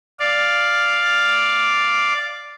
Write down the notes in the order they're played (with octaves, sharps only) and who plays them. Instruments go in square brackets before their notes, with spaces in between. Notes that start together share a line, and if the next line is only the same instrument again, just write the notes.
[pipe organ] D5 F5